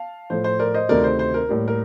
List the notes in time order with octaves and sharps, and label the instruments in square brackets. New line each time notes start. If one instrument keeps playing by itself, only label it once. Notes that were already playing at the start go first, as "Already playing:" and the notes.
Already playing: [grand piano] F5 A5
A2 F3 A3 C5
C5
A#4 D5
C5 D#5
D2 C3 D#3 A3 A#4 D5
C5
C5
A#4
A2 G3 A#3
A#4